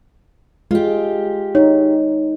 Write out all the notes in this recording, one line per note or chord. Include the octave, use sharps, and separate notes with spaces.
G#3 F4 G4
D#4 C#5